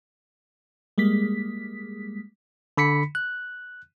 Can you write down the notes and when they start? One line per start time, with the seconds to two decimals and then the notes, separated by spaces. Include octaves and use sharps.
0.98 G3 G#3 A#3 B6
2.77 D3 B5 B6 C#7
3.15 F#6